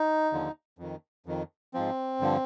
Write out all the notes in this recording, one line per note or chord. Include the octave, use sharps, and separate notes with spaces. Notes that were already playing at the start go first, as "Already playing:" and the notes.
Already playing: D#4
D#2 D3 F3
F2 D#3
F2 D#3
G#2 F3 C4
G2 D3 F3